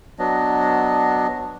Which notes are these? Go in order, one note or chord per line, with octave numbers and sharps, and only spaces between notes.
F#3 B3 D4 D#5